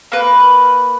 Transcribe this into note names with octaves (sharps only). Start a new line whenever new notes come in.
A#3 B4